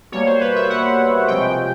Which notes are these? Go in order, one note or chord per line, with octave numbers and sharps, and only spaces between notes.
B2 G3 A#3 C#5
C5
B4
E5
F#5
C3 F3 G#3 G5